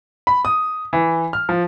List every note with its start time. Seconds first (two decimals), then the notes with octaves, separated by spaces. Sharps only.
0.27 B5
0.45 D#6
0.93 E3
1.33 F6
1.49 F3